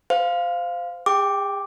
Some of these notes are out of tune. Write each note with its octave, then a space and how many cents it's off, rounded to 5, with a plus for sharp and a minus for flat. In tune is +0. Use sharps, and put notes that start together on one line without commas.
C5 -25 F5 +0
G#4 -45 G5 +0 D6 +0